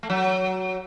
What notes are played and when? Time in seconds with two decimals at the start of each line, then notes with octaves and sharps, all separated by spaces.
0.03 A3
0.10 F#3